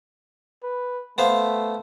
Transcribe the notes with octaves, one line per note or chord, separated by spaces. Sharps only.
B4
A3 B3 C5 F5